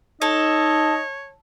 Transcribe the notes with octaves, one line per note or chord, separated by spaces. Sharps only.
D#4 A4 C#5 D#5